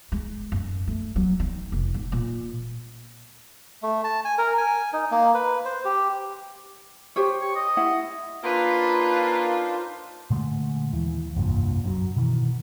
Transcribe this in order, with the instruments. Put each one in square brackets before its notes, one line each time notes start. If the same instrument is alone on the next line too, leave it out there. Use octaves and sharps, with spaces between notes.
[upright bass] G#3
F#2
A3
F#3
D#3
F1
G#2
A#2
[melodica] A3
A5
G#5
A#4
G#5
D#4
A#3
B4
C5
G4
[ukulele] G4 C5 C#5
[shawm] C#6
D#5
[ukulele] E4 F#5
[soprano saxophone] A#3 [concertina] D4 D#4 C5 [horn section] F4 [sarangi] B4
[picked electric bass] A#2 D3 G#3 A3
D#2 E3
F1 C2 G2 A#2
F#2 D#3 F#3
B2 D#3 E3